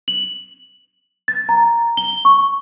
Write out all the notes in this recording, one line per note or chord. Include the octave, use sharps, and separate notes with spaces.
F#7
A6
A#5
G7
C#6